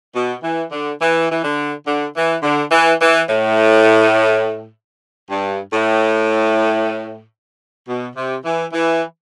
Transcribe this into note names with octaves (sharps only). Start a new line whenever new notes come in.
B2
E3
D3
E3
E3
D3
D3
E3
D3
E3
E3
A2
G2
A2
B2
C3
E3
E3